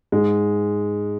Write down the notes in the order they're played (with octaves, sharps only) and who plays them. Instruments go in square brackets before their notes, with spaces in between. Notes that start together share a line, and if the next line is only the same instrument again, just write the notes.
[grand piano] G#2 G#3